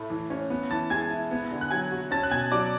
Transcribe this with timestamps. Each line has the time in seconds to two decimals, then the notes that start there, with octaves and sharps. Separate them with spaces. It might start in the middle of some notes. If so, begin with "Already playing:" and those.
Already playing: A2 A3 B5
0.10 E3
0.30 C#4
0.50 B3
0.71 E3 A5 A6
0.90 G#3 G#5 G#6
1.10 E4
1.31 B3
1.51 D3
1.61 F#6
1.71 F#3 G#5 G#6
1.91 F#4
2.11 C#4 A5 A6
2.23 F#6
2.31 B2 G#5 G#6
2.52 F#3 D5 D6